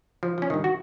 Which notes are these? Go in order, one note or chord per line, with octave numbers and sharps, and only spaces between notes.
F3
F3 C#4
G2 D#3
F#4